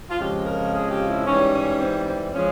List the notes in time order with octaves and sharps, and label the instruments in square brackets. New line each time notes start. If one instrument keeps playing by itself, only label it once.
[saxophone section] F4
F2 C#3 F3 G#3 G4
A#4
G#4
G4
E4
G#2 E3 G3 C#4
C#4
C4
C4
F3 G#3 C#4